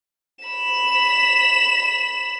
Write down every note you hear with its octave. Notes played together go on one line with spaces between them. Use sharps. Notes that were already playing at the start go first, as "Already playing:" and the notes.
B5 E7